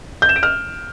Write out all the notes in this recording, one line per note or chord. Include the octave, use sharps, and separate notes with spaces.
G6
E7
D7
F6